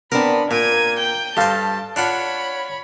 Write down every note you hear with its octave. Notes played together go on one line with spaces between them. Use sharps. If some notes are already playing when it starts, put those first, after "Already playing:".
B3 C4 D4 A#4 B5
A#2 A#3 G#6 D#7
G5 G6
G2 A4 C5 F5 A5
D4 F4 C#5 F#5 B5